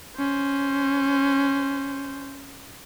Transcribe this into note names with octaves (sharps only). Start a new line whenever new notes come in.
C#4 C5